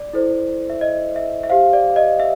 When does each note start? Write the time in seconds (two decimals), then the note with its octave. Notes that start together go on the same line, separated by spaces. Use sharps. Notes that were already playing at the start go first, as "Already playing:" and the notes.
Already playing: D5
0.13 E4 A4 C5
0.70 E5
0.81 D#5
1.16 E5
1.43 E5
1.50 G4 C5 F5
1.73 D5
1.96 D#5
2.20 E5